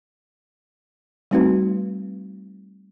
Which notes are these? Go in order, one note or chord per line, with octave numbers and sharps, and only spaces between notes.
G3 A3 C4 D#4 F#4 B4